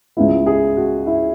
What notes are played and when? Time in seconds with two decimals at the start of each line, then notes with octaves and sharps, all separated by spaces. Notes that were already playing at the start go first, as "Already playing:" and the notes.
0.17 C#2 C#3 G#3 B3 E4
0.46 G#4
0.77 F#4
1.07 E4